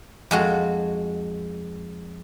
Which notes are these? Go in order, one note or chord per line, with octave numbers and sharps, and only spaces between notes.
F2 G#3 F#4